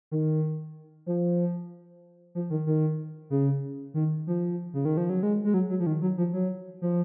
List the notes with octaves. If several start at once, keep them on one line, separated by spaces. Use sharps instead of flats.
D#3
F3
F3
D#3
D#3
C#3
D#3
F3
C#3
D#3
F3
F#3
G#3
G#3
F#3
F#3
F3
D#3
F#3
F3
F#3
F3